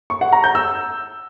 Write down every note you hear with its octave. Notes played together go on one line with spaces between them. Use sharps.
C#6
F#5
A#5
G6
E6